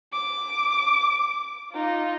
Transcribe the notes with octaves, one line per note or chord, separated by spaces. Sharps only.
D6
D#4 F4